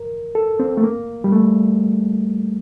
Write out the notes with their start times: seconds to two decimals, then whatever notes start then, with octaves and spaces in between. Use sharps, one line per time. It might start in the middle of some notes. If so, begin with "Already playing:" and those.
Already playing: A#4
0.35 A4
0.60 C4
0.77 A3
0.84 A#3
1.24 G3
1.32 A3